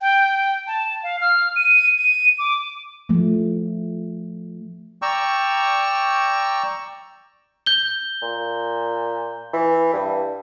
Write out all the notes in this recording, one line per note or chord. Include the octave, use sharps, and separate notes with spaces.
G5
A5
F5
F6
D#7
D#7
D6
F3 A3
D5 G5 A#5 C#6 E6
G6 G7
A#2
E3
G2